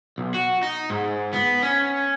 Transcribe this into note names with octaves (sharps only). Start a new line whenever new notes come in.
B1
F#4
D#4
G#2
B3
C#4